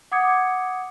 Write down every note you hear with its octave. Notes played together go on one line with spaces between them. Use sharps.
F#5 D6 D#6 G#6 C#7